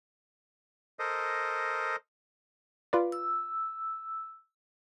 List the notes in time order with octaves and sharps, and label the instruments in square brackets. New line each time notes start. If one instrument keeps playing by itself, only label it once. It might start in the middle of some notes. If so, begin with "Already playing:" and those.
[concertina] A4 A#4 C5 D#5
[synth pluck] F4 B4 D5
[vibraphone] E6